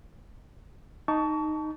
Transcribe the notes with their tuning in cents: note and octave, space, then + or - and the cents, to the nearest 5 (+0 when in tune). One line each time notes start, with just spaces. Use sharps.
D#4 -5 A5 +0 C#6 +35